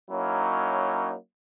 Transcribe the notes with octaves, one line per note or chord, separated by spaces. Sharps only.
F#3 A#3 C#4 D#4 E4